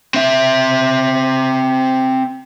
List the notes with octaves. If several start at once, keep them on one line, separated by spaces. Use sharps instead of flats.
C4 E5